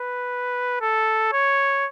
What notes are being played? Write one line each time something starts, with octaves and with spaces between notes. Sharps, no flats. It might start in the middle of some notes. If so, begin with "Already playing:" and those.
Already playing: B4
A4
C#5